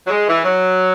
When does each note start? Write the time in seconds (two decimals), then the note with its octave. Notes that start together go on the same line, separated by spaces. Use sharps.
0.06 F#3
0.10 G#3
0.28 E3
0.44 F#3